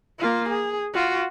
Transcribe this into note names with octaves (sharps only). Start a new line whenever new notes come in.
A#3 F4
G#4
F4 F#4